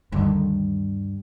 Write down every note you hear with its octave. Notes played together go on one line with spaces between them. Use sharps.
D2 G2 D3 D#3